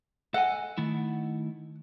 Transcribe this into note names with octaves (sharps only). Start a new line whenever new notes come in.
A4 D#5 F#5 G#5
D#3 A3 E4